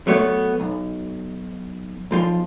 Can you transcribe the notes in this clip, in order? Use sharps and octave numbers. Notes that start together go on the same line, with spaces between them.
F#3 A3 B3 C#5
B1
B1 F3 F4